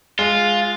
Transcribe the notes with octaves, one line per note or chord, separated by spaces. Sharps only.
G#3 F4